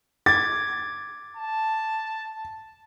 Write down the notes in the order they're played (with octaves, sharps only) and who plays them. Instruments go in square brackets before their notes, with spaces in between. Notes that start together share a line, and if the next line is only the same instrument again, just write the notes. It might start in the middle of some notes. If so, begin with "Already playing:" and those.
[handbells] D6 G#6 [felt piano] A6
[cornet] A5